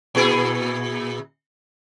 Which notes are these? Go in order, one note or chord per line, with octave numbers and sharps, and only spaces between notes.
A#2 E4 G#4